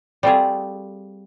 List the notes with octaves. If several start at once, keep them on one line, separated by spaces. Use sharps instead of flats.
G3 A3 C4 F4 G4 G#4